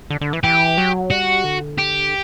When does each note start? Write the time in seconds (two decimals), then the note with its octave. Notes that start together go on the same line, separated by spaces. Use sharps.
0.10 D3
0.21 D3
0.33 E3
0.44 E3 G4
0.78 F#3
1.10 G3 F#4
1.44 D3
1.78 G4